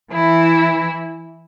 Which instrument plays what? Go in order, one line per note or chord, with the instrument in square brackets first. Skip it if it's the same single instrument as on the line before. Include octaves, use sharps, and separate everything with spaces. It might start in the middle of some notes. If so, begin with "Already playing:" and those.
[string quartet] E3 E4